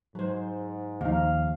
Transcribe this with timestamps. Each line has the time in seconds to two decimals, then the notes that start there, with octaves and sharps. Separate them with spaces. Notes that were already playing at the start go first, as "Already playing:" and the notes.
0.15 G#2 F#3 C5
1.01 D#2 F3 D#4 F5